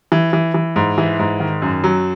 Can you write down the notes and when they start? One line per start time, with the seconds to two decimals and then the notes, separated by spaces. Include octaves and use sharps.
0.12 E3
0.33 E3
0.54 E3
0.76 G#2
0.98 E3
1.19 G#2
1.40 D#3
1.62 F#2
1.84 F#3